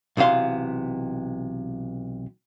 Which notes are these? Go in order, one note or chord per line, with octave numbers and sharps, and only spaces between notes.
B1 C3 E3 F5 C6